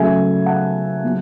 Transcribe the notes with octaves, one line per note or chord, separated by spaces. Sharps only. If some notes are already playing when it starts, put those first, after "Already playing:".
Already playing: C#3 F#3 A3 E5 G#5
F#5 A5
F#3 B3